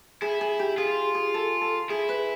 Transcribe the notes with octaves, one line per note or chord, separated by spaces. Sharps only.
E4 G#4
G#4
G4
F4 G#4
G#4
A4
A4
E4 G#4
B4